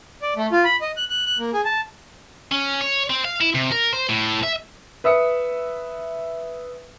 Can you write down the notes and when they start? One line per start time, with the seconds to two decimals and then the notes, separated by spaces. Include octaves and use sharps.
0.22 D5
0.36 A3
0.52 F4
0.65 B5
0.81 D#5
0.97 F#6
1.10 F#6
1.26 F#6
1.39 A#3
1.53 G#4
1.65 A5
2.52 C#4
2.81 C#5
3.10 C4
3.25 F5
3.41 E4
3.55 C3
3.72 A#4
3.93 C5
4.09 A2
4.43 E5
5.04 B4 E5 D#6 C#7